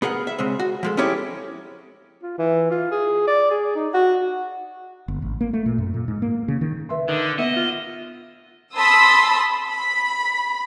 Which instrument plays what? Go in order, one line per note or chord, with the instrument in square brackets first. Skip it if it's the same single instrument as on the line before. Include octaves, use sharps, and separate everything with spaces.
[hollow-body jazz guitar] B3 G#4 A#4 F5 F#5
E5
C#3 G#3 C4
F#4
F3 G#3 A4
C#4 D#4 E4 G4 A4 C#5
[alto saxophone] F4
E3
F4
G#4
D5
G#4
D#4
F#4
[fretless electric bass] G1
A1
A#3
A3
A#2
F#2
A#2
G#2
A#3
C#3
D#3
[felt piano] B4 E5 C6
[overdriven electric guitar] D3 [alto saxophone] D#3
[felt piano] B3 [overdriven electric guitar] D#5 [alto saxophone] E5
[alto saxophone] F4
[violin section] A5 B5 C6 D#6 E6
B5